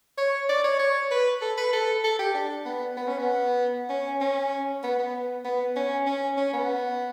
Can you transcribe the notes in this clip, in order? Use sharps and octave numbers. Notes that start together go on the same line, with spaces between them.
C#5
D5
C#5
C#5
B4
A4
B4
A4
A4
G4
D4
B3
B3
C#4
B3
C#4
C#4
B3
B3
B3
C#4
C#4
C#4
B3